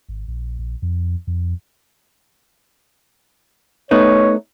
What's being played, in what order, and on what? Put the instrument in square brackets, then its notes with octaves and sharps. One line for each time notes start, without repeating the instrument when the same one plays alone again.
[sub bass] G#1
A#1
A#1
F2
F2
[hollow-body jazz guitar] A3 B3 D#4 [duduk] C#5